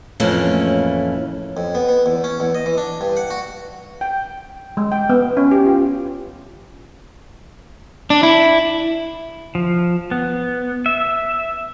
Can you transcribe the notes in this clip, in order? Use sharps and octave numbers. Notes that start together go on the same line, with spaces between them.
F2 A2 E3 A3 A#3 C#4
F2
B3
B3
E2
C#4
E2
D#5
E3
D4
G2
F#5
F#4
G5
G#3
G5
B3
C#4
G4
F4
D4
E4
F3
B3
E5